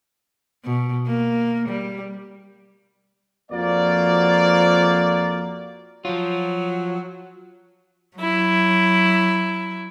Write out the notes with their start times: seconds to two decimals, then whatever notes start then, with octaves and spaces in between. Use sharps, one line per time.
0.65 B2
1.07 A#3
1.68 G3
3.52 F2 F3 A#3 F#4 D5
6.05 F3 F#3 F4
8.16 F#3 E4